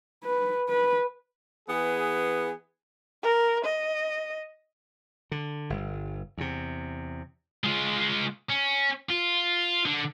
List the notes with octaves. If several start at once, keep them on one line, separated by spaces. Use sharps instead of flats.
B4
B4
E3 B3 G#4
A#4
D#5
D3
G1 G2
E2 C3
G#3 F4
C#4
F4
D3